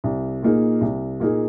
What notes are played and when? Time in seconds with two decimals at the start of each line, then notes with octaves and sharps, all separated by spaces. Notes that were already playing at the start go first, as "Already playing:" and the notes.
0.04 C2
0.43 A#2 A#3 D#4 G#4
0.81 C2
1.20 A#2 A#3 D#4 G#4